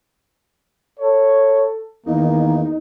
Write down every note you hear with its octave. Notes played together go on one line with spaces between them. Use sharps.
A4 C#5
E2 D#3 A#3 D#4